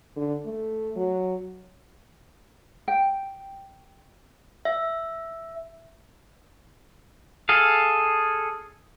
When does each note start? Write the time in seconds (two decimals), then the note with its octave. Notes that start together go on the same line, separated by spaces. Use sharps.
0.16 D3
0.45 A3
0.96 F#3
2.88 G5
4.65 E5
7.49 G#4 A4 F5